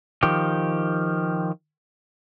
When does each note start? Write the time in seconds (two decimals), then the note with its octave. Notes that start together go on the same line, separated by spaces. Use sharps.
0.23 D#3 F3 G4